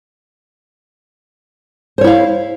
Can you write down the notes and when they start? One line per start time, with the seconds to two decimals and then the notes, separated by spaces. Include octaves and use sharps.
1.98 C5
2.01 C#5
2.04 E4
2.07 F5